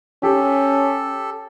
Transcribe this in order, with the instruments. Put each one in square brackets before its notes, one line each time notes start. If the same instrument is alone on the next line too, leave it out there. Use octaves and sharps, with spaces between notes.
[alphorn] C#4 [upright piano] G4 [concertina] A4